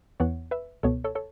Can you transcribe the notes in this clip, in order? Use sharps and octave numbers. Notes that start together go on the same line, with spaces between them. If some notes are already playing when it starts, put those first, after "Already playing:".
E2 E3 B3 C#5 F#5
B4 E5
C#2 B2 B3 A4 C#5
A4 C#5
A4 C#5